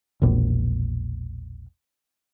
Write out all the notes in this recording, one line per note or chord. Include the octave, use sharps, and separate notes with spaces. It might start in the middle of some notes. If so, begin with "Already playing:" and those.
E1 A#1